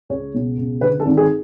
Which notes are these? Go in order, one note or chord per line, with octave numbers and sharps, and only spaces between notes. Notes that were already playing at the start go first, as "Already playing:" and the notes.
C#2 C#5
B2
C#2
D3 B4
A4
G#1
G#4